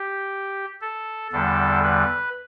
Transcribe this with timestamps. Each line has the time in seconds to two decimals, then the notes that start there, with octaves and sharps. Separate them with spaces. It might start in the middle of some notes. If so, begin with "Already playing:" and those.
Already playing: G4
0.81 A4
1.32 E2 D3 G3 A4
1.83 B4